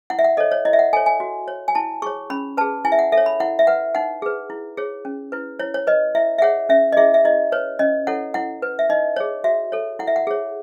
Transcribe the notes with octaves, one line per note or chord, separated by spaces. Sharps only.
E4 F#5
E5
F#5
A4 C#5 D#5
C#5
E4 D#5
E5
F#5
A4 C#5 G#5
G#5
F#4
C#5
G#5
E4 A5
G#4 C#5 C#6
C#4 B5
G#4 B4 A5
E4 G#5
E5
F#5
A4 E5
C#5
B5
E4 F#5
E5
B4 F#5
D#4 F#5
G#4 B4
E4
G#4 C#5
C#4
E4 B4
E4 C#5
C#5
B4 D#5
E4 E5
E5
G#4 C#5 F#5
C#4 E5
D#5
E4 G#4 E5
E5
E4 D#5
B4 C#5
C#4 D#5
E4 A4 C#5 F#5
E4 F#5
B4
E5
D#4 D#5
G#4 C#5
F#4 E5
A4 C#5
E4 F#5
E5
F#5
G#4 C#5